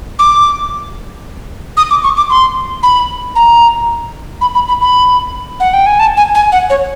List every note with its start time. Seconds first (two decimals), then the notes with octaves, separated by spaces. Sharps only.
0.19 D6
1.77 D#6
1.90 D6
2.04 C#6
2.17 D6
2.30 C6
2.83 B5
3.35 A#5
4.41 B5
4.55 B5
4.68 B5
4.81 B5
5.60 F#5
5.73 G5
5.86 G#5
5.99 A5
6.17 G#5
6.35 G#5
6.52 F#5
6.70 C#5